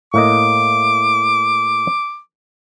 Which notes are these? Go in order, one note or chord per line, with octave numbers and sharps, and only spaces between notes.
A2 A#3 D#5 D6